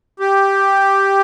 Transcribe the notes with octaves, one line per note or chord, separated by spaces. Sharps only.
G4